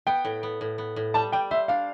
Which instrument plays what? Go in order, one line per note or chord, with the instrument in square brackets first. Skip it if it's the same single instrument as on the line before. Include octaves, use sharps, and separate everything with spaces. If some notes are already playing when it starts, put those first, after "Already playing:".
[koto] B3 [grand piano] G5
[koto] A2
B3
A2
B3
A2
[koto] G3 [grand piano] A5
[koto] G3 [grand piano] G5
[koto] C5 [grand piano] E5
[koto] D4 [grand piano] F5